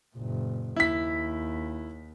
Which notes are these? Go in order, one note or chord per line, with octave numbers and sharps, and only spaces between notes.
F#1 A#2
D#2 E4 B6